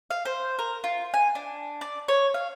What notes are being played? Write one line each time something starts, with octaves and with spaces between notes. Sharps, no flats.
F5
C5
A#4
F4
G#5
D4
D5
C#5
F5